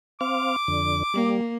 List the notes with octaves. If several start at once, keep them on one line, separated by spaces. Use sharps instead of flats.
C4 F5 D6
F2 D3
G3 A#3